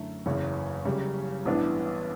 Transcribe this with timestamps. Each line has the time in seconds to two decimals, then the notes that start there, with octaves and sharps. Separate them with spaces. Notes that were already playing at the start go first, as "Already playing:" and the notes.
Already playing: F#2 D3 A3 E4
0.26 F#1 E2 C#3 E3
0.85 F#2 C#3 G3
1.45 A1 G2 E3 B3 D4